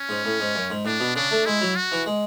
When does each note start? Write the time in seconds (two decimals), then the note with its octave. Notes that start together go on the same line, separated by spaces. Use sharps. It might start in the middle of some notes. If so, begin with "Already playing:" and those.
Already playing: C#4
0.09 G#2
0.25 A2
0.40 G#2
0.55 F#2
0.70 G#2
0.85 A2 D4
1.00 B2
1.16 C#3 D4
1.31 A3
1.46 G#3 E4
1.61 F#3
1.76 F#4
1.92 E3
2.06 G#3